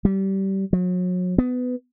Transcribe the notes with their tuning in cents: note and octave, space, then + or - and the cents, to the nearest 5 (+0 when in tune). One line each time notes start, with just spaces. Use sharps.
G3 -20
F#3 -35
B3 +20